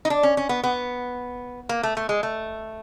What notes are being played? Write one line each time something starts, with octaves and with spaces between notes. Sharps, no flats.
D#4
D4
C#4
C#4
B3
B3
A#3
A3
A3
G#3
A3